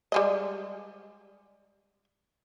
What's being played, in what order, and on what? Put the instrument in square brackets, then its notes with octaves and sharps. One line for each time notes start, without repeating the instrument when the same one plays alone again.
[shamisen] G3 G#3 D#5